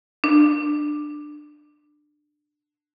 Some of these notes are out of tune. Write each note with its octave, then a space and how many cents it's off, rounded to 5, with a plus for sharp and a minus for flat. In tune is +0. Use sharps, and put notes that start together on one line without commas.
D4 +20